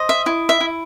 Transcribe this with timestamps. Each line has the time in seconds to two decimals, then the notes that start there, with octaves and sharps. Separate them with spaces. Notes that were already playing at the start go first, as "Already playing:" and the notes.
Already playing: C5 D#5
0.09 E5
0.26 E4
0.49 E5
0.61 E4